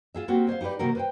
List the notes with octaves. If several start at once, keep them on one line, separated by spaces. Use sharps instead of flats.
F4 G#4 E5
A#3 C4 F#4 G4
G#4 C5 E5 F5
D#4 G4 G#4 B4 D5
C3 D#3 A#3 F#4 G4 A#4
B4 C5 G5